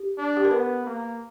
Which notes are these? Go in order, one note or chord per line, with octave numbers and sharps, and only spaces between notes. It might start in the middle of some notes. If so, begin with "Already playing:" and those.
Already playing: G4
D4
G4
A#4
B3 B4
A#3